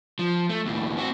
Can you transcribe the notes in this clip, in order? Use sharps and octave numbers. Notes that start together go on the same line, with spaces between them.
F3
A3
D#2 A2
C4 F#4